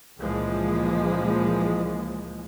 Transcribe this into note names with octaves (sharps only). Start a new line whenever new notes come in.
C#2 A#2 E3 F3 G#3 A#3